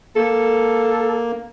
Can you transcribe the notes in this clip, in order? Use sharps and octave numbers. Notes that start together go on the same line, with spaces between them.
A#3 A4